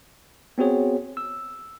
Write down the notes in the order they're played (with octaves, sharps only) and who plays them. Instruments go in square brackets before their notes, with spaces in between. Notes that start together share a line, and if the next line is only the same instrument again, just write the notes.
[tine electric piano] B3 C4 F#4 G#4 C#5
E6